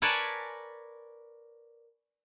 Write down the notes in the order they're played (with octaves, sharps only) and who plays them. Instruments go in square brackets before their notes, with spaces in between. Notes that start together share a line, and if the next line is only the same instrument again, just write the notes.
[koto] A#4 B4 C#5 D5 G#5 A5